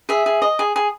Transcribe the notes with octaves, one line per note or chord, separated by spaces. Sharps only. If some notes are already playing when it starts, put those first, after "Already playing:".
G#4 E5
G#4
D#5
G#4
G#4